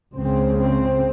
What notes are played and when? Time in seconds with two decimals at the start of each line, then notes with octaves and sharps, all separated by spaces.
0.16 C#2 C#3 C4
0.59 C4